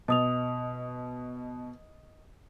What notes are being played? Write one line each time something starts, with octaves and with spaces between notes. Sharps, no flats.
B2 D#5 D#6 F7